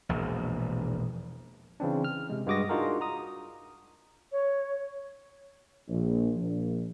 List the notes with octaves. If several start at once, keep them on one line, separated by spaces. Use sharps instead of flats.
E1 A#1
C#3 E3 C4 D4
F6
C3 G#3
G2 G#3 F#4 D6 D#6 A#6
D4 D#4 F4 F#4 G#4 A#4
A#5 D#6
C#5
A#1
A#1